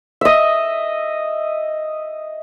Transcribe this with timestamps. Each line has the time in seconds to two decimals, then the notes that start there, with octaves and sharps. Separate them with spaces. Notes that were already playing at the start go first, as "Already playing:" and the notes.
0.21 D#5 E5